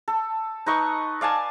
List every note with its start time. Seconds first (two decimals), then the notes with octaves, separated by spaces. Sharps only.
0.08 A4
0.66 D#4 B4 D#5 C#6
1.21 D5 F5 G#5 A5